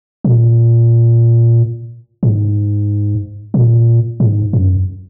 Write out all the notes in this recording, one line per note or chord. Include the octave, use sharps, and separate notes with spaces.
A#2
G#2
A#2
G#2
F#2